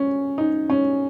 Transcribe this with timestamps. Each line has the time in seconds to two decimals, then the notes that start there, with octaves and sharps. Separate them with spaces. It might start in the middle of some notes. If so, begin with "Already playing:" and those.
Already playing: C#4
0.38 D#4
0.70 C#4